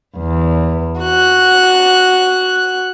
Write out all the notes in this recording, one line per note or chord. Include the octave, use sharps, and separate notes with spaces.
E2
F#4 F#6